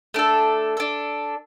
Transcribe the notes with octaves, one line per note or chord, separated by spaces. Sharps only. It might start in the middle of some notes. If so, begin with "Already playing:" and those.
A3 D4 A4
D4 A4